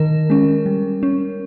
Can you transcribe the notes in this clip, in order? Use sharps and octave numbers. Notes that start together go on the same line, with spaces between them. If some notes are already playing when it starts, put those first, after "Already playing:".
Already playing: D#3 A#4
G#3 C#4
G3
C#4